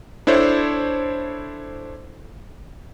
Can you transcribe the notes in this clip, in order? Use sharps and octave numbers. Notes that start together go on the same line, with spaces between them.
D4 E4 A4 C5 C#5